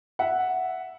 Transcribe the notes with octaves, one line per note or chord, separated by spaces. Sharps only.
E5 F#5